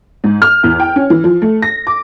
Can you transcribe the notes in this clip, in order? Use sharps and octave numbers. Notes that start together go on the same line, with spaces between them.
G#2
F6
E2
G5
C#4
E3
F3
A3
A#6
D6